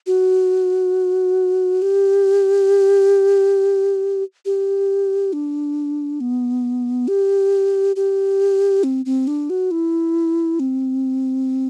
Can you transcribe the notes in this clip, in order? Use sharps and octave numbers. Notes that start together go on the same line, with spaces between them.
F#4
G4
G4
D4
B3
G4
G4
C4
C4
D4
F#4
E4
C4